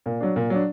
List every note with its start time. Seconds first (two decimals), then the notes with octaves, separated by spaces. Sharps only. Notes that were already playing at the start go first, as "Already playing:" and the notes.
0.06 A#2
0.20 F#3 D4
0.36 A#2
0.50 F#3 D4